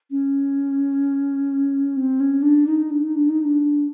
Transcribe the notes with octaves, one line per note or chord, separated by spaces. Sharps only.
C#4
C4
C#4
D4
D#4
D4
D#4
D4
D#4
D#4
D4